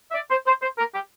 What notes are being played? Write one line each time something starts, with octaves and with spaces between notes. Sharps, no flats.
E5
D5
C5
C5
C5
A#4
G4